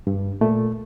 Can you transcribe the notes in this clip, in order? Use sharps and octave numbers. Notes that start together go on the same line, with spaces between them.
G2
A#2 A3